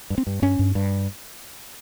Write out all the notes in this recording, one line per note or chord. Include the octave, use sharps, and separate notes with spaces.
G2
C4
G2
G2 C#4
G2
G2